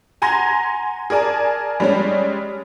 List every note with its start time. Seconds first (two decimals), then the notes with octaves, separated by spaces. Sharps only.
0.22 F#5 G#5 A#5 C6 G#6 A#6
1.10 G#4 A#4 D5 G#5 A5
1.80 G3 G#3 C#4